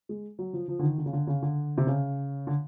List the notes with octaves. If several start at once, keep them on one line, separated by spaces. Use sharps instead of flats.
G#3
F#3
F3
F3
D3
D#3
D3
C#3
D3
C#3
D3
C3
C#3
D3